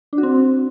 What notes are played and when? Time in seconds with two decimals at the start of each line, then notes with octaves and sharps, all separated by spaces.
0.13 D4
0.18 F#4
0.23 C4